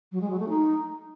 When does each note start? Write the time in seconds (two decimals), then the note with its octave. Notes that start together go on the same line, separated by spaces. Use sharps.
0.12 F#3
0.21 G#3
0.30 F#3
0.39 A3
0.49 D#4